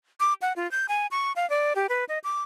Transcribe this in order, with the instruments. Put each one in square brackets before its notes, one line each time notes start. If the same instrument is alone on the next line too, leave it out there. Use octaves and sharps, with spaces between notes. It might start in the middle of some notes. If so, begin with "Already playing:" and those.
[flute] D6
F#5
F4
G6
G#5
C#6
F5
D5
G4
B4
D#5
D6